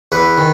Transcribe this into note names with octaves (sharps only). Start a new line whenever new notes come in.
E2 B4
D#3